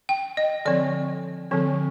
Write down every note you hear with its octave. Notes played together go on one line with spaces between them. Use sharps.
G5
D#5
D3 F3 C4 D5
D3 F3 C4